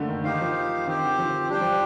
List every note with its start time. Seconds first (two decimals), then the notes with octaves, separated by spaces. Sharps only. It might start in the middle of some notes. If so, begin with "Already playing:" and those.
Already playing: D3 A3 A#3 D4
0.08 D#3
0.24 D#3 D#4 G4 C5 F5
0.41 F3
0.87 D#3 C4 G4 C5
1.02 D3
1.18 F3
1.49 G3 D4 G4 C5 G5
1.61 F3